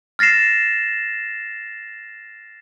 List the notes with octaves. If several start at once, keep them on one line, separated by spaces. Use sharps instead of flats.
F6 A6 A#6 C7 E7